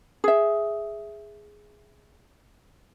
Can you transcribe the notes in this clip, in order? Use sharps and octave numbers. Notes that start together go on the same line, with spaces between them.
G#4 E5